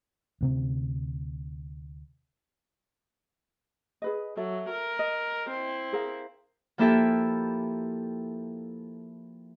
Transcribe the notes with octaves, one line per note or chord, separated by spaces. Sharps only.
D2 C3 C4
G#4 B4 D#5
F#3 A4 E5
A#4
D#5
C4 E4
G#4 A#4 F5
F3 A#3 E4 G4 A4 E5